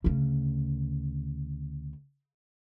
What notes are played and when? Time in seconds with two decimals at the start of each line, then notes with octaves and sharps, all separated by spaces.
0.04 D2 C#3